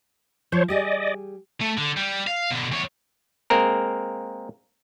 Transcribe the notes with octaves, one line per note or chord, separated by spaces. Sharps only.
F3 C5 C#5
G3 G4 G#4 D5 D#5
A3
D3
G3
F5
B2 D3
E2 C#5
G#3 A#3 C4 A#4